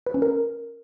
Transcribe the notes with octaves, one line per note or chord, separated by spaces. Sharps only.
B4
C#4
A#4